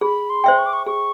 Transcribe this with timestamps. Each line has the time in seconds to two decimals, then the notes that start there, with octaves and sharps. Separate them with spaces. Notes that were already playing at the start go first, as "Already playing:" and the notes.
0.01 G#4 B5
0.30 C6
0.44 C5 E5 G5
0.58 C#6
0.66 D6
0.73 C#6
0.86 G#4 C#6